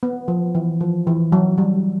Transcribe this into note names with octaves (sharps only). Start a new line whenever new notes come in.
B3
F3
E3
F3
E3
F#3
G3